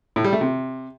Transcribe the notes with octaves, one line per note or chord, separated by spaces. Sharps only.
A2
G3
A3
C3